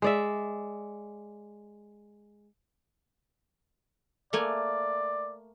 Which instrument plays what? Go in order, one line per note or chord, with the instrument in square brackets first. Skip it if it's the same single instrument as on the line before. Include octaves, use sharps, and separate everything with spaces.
[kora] G#3 D5 E5
[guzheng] A3 A#3 G#5 [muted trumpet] D5